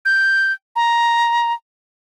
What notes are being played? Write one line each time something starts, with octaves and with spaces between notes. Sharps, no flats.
G6
A#5